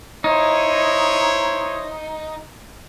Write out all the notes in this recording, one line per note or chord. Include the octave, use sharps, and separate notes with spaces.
D#4 E4 C5 C#5